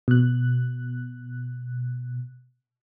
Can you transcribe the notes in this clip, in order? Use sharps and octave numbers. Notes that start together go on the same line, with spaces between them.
B2 F#6